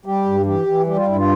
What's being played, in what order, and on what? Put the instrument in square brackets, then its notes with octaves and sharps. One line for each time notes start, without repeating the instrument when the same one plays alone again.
[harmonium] G3 G4
G2
E3 G4
E3
G3 G4
F4
G2 E4
F4